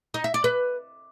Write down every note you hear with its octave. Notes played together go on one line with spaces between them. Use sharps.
D#4
E5
D5
B4